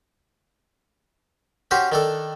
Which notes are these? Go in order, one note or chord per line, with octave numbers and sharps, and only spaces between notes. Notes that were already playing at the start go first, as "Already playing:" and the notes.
C#4 F#4 G4 C5
D#3 D4 A4